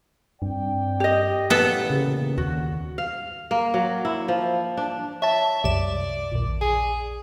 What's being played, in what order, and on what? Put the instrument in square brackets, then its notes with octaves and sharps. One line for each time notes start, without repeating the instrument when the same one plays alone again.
[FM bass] G2 [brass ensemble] C4 D5 G5
[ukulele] G4 D#5
[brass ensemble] A1 E2 A#2 [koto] B3 A4
[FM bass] C#3
[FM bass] D#2 [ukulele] F#4
[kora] F5
A#3
F#3
E4
F3
D4
[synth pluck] C#5 A5 [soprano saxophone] E5
[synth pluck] C2 F#2 E7 [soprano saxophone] D5
[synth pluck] A#1 D#2
[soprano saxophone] G#4